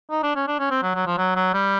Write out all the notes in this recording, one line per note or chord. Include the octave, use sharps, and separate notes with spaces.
D#4
D4
C#4
D4
C#4
C4
F#3
F#3
F3
F#3
F#3
G3